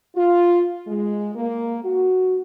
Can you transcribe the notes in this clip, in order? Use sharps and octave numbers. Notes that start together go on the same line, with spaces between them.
F4
G#3
A#3
F#4